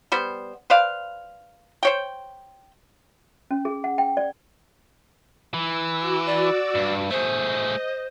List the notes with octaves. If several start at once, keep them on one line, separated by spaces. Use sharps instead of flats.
G3 B3 C5
B4 C5 D5 F5
C5 C#5 G5
C#4
G#4
F#5
G5
D5
E3 E6
F#4 D6 E6
D5
G2
A3 G#4 C5
D#5